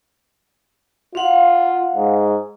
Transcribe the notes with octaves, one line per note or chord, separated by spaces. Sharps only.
F4 F5 F#5
G#2